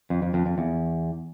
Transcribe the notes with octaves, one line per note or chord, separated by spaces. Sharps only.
F2
F2
F2
F2
E2